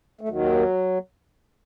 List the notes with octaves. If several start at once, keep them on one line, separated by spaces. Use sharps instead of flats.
A3
D#2 D#3 F#3